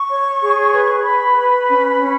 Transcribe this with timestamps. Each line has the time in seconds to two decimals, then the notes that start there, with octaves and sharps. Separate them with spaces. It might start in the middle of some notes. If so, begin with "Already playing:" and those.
Already playing: C#6
0.09 C#5
0.41 G#4
0.73 B4
1.05 B4 B5
1.37 B4
1.69 C#4
2.01 C#4